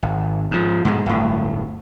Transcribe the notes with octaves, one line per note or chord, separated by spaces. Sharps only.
G#1
G#2 F3
G#2 B2 G#3
D1 G1 A2